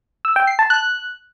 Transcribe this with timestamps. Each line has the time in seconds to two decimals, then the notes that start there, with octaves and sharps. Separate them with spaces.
0.25 E6
0.36 G5
0.47 C7
0.59 A5
0.70 F#6